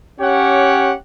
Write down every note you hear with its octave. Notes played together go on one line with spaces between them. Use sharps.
C#4 G4 C#5 F#5